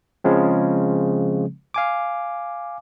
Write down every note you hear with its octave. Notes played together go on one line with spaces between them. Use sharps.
C#3 F3 G#3 C4
F5 G#5 D6